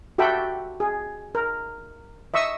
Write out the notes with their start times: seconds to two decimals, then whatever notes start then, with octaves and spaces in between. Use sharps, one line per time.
0.18 F#4 G4 A4 E5 G5 B5
0.80 G#4
1.35 A#4
2.34 D#5 E5 C#6 E6